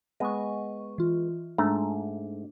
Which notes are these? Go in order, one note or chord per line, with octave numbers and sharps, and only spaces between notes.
G#3 B3 D#5 C#6
E3 F4
G#2 A3 D4 A#5